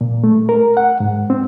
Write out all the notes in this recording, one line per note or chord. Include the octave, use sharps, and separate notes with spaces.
A#2
A3
A#4
F#5
G#2
C4